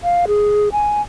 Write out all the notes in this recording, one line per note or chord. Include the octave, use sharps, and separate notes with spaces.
F5
G#4
G#5